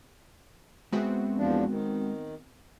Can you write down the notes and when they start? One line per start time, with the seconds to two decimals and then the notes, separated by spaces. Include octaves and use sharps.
0.92 G#3 B3 C4 F#4 E5
1.37 E2 F3 D4
1.69 D#3